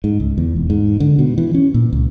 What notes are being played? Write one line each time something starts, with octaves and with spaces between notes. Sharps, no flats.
G#2
C#2
E2
E1
G#2
D3
B2
E3
C#4
A#2
C#2